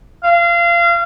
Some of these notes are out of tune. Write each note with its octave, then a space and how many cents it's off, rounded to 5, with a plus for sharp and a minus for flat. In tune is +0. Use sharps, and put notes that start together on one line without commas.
F5 -25